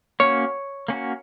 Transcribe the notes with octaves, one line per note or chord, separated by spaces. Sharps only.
A#3 C#4 F#4 C#5
A#3 C#4 F#4